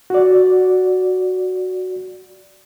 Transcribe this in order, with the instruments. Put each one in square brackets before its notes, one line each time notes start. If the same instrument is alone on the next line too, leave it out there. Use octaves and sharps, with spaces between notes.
[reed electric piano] F#4 D5